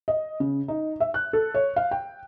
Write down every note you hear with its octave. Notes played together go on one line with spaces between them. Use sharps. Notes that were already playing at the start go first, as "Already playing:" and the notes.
D#5
C#3
D#4
E5
F#6
A4
C#5
F5
G5